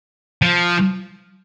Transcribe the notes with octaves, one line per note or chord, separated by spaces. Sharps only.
F3